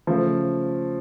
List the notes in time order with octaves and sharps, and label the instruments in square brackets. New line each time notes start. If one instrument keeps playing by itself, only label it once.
[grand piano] C#3 F3 A3